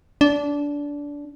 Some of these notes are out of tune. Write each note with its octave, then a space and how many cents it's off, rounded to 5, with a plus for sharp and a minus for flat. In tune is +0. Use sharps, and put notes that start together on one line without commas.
D4 -20